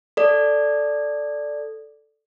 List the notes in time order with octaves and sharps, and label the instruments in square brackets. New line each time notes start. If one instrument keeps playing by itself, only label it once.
[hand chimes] A4 D5